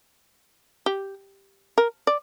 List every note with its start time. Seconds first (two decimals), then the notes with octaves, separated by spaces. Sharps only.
0.86 G4
1.78 A#4
2.07 D5